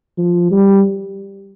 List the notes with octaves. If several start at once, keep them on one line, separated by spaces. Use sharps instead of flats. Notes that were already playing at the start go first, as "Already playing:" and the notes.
F3
G3